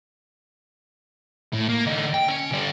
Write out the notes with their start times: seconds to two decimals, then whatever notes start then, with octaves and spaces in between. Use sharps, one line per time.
1.53 A2
1.69 A#3
1.86 D3 D#4
2.14 G5
2.29 C#4
2.52 D3 G3